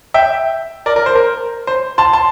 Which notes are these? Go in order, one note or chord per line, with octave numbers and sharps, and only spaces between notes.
E5 G5
A#4 D5
A#4
C5
A#4
C5
A5 C6
A5 C6